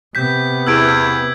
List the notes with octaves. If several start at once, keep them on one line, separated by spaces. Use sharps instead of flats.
C3 B3 G6 B6
E2 E6 G#6 D7